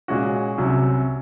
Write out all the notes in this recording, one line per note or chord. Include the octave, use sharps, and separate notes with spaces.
A#2 G#3 C#4 F#4
C2 C3 F#3 C#4